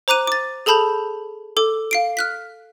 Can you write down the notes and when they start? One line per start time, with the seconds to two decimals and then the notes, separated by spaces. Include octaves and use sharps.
0.08 C5 A#5 D6 F#6 D#7
0.27 D6 A6
0.66 G#4 A4 A5 B5 G6 F7
1.57 A4 D6
1.91 F5 C7 D7
2.17 F6 F#6 B6